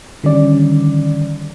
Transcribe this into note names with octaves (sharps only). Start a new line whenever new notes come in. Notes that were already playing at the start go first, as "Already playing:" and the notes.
D3 D#3 G3 C#4 D5